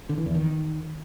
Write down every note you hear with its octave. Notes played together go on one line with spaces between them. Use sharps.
D3
E3
E2
D#3